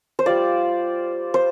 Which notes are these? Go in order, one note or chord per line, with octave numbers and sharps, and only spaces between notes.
C5
G3 F4 D5
C5